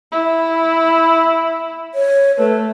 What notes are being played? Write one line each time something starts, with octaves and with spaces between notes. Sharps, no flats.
E4
C#5
A3 B4